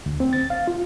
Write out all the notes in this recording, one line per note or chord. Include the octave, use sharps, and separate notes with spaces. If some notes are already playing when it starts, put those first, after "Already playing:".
D2
C4
A6
F5
F4